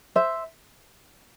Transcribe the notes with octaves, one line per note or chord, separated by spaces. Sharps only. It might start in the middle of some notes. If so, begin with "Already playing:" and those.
C5 E5